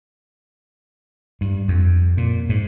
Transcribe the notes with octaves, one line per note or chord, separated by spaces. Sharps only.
G2
F2
A#2
G#2